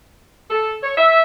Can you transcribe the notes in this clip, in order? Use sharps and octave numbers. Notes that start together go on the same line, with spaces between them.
A4
C#5
E5